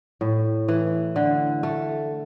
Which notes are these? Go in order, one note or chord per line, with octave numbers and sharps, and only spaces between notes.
A2
E3
D3
A3